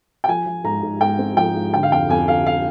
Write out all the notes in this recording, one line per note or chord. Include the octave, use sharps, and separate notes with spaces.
G5
F3 G#5
F3
G#2 A#5
G#2
G#2 G5
C4
F3 G5
G#2
D3 G5
F5
F2 G5
F2 G#5
D3 F5
F5